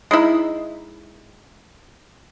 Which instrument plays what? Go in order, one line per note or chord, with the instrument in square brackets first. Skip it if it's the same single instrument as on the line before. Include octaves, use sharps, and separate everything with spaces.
[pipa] G#3 D#4 E4